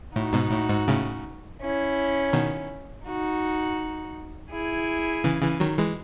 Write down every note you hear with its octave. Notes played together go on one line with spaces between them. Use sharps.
A2 D#4 F#4
G#2 B2
A2
G#2
A2 C#3
C#4 E4
B2 D#3
D#4 F#4
E4 G#4
C#3 E3
C#3 E3
D#3 F#3
E3 G#3